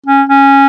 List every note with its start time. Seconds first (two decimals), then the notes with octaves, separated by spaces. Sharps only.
0.06 C#4
0.29 C#4